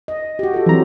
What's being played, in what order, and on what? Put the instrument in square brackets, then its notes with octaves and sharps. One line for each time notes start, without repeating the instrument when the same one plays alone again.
[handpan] D#5
F#4 G4
F4 A4
[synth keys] E3 A#5 [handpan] F#3 C4